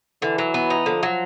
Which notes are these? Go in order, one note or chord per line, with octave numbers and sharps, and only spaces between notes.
D3 E3
F#3
B3
D#4
D3 F3
F#3